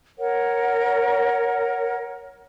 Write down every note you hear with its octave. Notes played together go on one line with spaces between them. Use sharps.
A#4 C#5 F#5